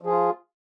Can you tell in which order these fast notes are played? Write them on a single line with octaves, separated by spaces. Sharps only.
F3 G#4 F4